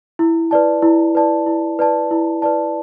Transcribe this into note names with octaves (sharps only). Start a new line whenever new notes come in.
E4
B4 D5 A5
E4
B4 D5 A5
E4
B4 D5 A5
E4
B4 D5 A5